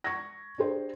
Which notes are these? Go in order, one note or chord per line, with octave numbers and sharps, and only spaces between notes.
C#6 G#6 A#6
D4 G4 G#4 C5